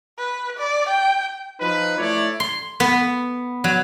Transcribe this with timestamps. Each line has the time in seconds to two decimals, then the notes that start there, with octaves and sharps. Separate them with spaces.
0.19 B4
0.58 D5
0.89 G5
1.60 F3 D#4 B4
1.98 A3 E4 C#5 D5
2.40 C6
2.80 B3
3.64 F#3